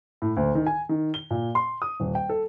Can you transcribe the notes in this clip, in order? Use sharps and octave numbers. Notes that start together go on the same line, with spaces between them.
A2
D2
D#3
G#5
D#3
G7
A#2
C6
D#6
D#1
G5
A4